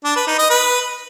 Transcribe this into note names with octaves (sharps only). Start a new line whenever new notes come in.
D4
B4
D#4
D#5
B4